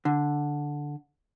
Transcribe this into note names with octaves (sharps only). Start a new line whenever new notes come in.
D3